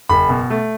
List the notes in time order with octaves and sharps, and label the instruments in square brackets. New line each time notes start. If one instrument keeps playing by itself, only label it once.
[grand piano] F#1 B5
B2
A3